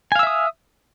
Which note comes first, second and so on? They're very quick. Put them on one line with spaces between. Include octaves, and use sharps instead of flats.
G#5 F5 E6 E5 D#6